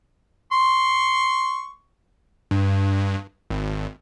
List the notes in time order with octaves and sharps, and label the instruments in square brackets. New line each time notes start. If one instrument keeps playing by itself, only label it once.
[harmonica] C6 C#6
[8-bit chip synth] G2
G#1